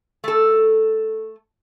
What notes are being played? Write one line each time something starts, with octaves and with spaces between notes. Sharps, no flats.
A3 A4